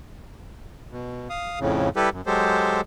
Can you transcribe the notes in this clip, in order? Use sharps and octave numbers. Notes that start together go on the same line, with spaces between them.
B2
F5 D#6
F2 A2 C#3
G3 E4 G4 A4 B4
F#2
F#3 G#3 G4 A4 C5